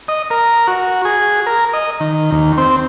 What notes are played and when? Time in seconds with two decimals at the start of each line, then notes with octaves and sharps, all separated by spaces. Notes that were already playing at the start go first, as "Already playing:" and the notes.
0.08 D#5
0.30 A#4
0.67 F#4
1.05 G#4
1.47 A#4
1.73 D#5
2.00 D#3
2.32 D#2
2.57 C4